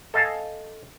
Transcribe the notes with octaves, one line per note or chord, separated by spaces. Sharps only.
A4 D#5 F5 G#5 A5